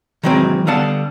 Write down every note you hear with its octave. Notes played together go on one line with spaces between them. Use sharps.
D#3 E3 F#3 G#3 C4
D3 G3 B3 F5 F#5 A5